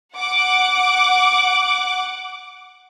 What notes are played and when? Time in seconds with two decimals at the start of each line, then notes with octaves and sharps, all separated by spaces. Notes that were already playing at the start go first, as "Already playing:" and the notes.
0.17 F#5 D6